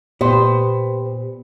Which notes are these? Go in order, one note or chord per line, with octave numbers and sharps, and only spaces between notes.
A#2 B3 G4 C5